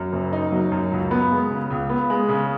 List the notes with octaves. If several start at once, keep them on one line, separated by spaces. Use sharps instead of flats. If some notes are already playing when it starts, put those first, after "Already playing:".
Already playing: F#2
F#1
D#4
F#3
F#2
C#2
B3
G#3
C#3
C#2
B3
G#3
C#3